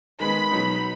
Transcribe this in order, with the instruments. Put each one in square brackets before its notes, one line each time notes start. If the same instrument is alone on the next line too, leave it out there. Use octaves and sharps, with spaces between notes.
[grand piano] D#3 G#3 B3 [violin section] B5
[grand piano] B2 F#3 B3 D#4